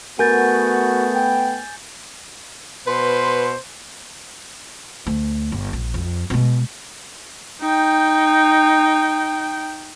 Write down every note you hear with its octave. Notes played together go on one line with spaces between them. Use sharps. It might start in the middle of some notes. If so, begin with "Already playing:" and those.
A3 B3 F#4 A#4 G#5 G6 A6
G5
B2 B4 C5 C6
D2
G1
A#1
F2
B2 G#3
D#4 G5